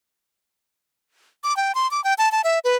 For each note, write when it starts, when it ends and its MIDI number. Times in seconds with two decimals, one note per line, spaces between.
1.44 1.56 86
1.57 1.75 79
1.75 1.89 84
1.91 2.03 86
2.04 2.14 79
2.18 2.31 81
2.32 2.41 81
2.44 2.59 76
2.64 2.77 71